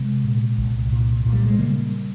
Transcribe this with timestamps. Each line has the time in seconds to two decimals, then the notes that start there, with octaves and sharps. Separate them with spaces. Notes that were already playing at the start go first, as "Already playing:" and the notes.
Already playing: C3 G#3 C4
0.24 A#2
0.58 C2
0.92 A#2
1.25 A#2
1.33 G3
1.46 G#3
1.59 C#3 G3 A#3